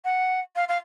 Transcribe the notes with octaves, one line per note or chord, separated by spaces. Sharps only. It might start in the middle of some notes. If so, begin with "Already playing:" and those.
F#5
F5
F5